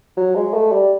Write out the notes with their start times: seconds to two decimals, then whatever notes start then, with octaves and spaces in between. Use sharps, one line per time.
0.17 F#3
0.35 G#3
0.54 A3
0.72 G3